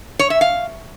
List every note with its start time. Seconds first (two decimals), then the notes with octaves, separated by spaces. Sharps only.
0.19 C#5
0.30 E5
0.41 F5